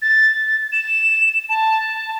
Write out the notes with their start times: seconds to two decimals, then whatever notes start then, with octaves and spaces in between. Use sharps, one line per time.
0.02 A6
0.72 E7
1.49 A5